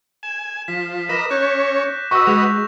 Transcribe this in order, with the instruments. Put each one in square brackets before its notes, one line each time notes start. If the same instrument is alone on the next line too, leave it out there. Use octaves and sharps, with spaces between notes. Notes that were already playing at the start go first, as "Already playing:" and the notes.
[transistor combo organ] G#5 [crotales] E7
[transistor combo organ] F3 [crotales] B6
[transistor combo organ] A#4 B4 D#5 [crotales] D6 A#6 E7
[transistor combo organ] C#4 C#5 [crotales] F#6 G6
[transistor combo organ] F#4 B4 D#5 [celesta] C#6 E6 [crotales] A#6
[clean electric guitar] G#3 [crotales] F7